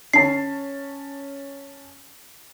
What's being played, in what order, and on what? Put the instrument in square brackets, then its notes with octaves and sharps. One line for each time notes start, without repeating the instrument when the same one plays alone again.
[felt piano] C#4 A5 [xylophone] C7